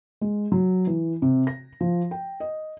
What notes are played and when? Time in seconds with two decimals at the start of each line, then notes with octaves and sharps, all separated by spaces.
0.21 G#3
0.52 F#3
0.87 E3
1.22 C3
1.47 A#6
1.81 F3
2.11 G5
2.40 D#5